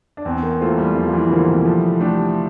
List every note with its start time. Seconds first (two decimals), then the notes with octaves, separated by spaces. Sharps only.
0.17 D4
0.25 E2 C4
0.43 A#3
0.61 E3 A3 A#3 F4 C5
0.78 G3
0.95 E2 F3
1.09 F3
1.13 E3
1.31 D3 E3 A#3 F4 C5
1.44 D3
1.48 C3
1.65 F3
2.00 A3 D4 G4